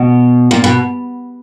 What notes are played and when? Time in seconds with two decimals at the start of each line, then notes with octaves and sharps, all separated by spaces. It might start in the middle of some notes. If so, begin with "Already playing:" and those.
Already playing: B2
0.51 A#2
0.64 B2